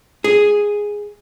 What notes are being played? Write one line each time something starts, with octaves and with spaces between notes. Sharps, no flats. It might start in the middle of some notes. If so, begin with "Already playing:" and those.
G#4